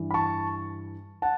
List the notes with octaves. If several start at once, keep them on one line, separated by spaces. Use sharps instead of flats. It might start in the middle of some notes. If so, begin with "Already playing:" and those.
Already playing: G2 E3
B5
A5 C#6
F#5 A5